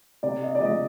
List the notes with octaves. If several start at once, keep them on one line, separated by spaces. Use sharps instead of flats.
C3 D5
D#5
D5
F3 G#3 D#5